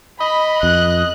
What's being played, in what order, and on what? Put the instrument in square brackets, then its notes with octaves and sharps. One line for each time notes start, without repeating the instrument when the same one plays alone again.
[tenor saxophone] D#5 [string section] B5
[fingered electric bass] F2 [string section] F#6